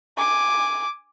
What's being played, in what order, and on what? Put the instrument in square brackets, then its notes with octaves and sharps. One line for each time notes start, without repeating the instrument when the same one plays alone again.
[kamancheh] G#5 D6